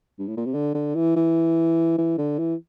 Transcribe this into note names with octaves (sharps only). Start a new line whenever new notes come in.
G2
A2
A#2
C3
D3
D3
E3
E3
E3
D3
E3